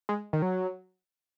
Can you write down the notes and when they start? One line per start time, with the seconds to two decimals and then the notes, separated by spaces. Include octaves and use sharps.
0.09 G#3
0.33 D#3
0.42 F#3